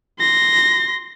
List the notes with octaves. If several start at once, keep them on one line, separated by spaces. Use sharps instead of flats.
C6 A#6